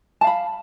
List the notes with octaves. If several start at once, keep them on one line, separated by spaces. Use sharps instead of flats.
F5 A5 B5